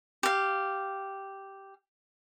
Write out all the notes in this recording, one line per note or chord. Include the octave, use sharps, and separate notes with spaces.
G4 F5